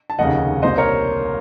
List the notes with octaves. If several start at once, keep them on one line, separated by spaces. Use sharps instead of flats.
A5
F1 D#2 C#3 D#5 F#5
C2 A#2 C5 D#5
A#4 C#5